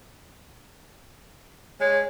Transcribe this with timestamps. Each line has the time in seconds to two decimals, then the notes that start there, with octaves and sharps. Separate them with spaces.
1.80 G#3 C#5